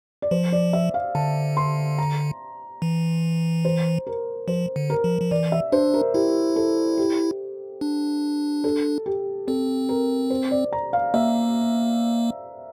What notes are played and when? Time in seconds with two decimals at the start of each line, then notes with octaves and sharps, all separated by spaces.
0.22 D5
0.31 F3 C5
0.53 D5
0.73 E5
0.94 F5
1.15 D3 A5
1.57 C6
1.98 A#5
2.82 E3
3.65 C5
4.07 A#4
4.48 F3 C5
4.76 D3
4.90 A#4
5.04 F3
5.22 F3
5.31 E3 D5
5.52 E5
5.72 D4 C5
5.94 A#4
6.14 E4 G4
6.56 A4
6.98 G4
7.81 D4
8.64 A4
9.06 G4
9.47 C4 A4
9.89 A#4
10.30 C5
10.51 D5
10.73 A#5
10.93 F5
11.14 A#3 E5